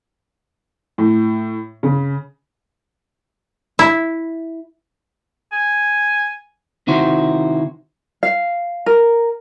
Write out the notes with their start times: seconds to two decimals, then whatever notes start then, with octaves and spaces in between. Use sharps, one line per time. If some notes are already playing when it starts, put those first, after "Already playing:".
0.98 A2
1.83 C#3
3.79 E4
5.52 G#5
6.87 C3 D#3 E4 F#4 C5
8.23 F5
8.86 A#4